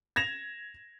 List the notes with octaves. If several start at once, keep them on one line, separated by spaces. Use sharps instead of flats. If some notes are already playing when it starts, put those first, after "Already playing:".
G#6 A#6 E7 F7